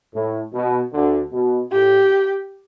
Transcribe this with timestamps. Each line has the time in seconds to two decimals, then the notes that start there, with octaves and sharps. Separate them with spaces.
0.13 A2
0.53 B2
0.93 D2 D3
1.32 B2
1.72 A2 G4